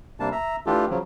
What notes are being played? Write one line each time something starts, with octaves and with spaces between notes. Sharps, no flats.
C3 G3 A#3 D4 A5
E5 A#5
E3 A3 D4 F4 G4 A4
C#3 F3 F#3